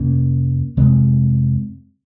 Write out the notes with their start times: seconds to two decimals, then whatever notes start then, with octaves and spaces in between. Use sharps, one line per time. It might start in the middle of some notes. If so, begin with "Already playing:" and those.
Already playing: F2 C3 A#3 C#4
0.77 F2 C3 G#3 C4